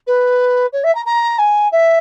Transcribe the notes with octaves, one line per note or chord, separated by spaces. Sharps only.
B4
C#5
E5
A#5
A#5
G#5
E5